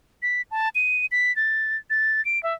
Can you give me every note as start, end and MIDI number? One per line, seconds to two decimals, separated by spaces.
0.22 0.42 95
0.51 0.69 81
0.75 1.06 99
1.12 1.35 95
1.36 1.77 93
1.90 2.23 93
2.25 2.41 98
2.43 2.54 76